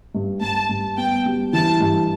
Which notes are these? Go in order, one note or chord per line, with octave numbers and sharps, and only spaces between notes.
G2
G2 A5
G2
B3 G5
G3
E3 A5
G2